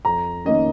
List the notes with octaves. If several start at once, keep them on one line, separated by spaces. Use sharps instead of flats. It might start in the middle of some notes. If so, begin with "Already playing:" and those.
F2 A#5
D#3 A#3 C#4 D#5